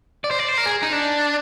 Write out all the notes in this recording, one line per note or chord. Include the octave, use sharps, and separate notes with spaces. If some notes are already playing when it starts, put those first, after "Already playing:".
D5
C5
D5
C5
A#4
G#4
D#4
D4